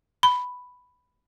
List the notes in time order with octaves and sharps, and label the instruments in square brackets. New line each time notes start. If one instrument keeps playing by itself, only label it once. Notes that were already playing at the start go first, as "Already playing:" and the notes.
[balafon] B5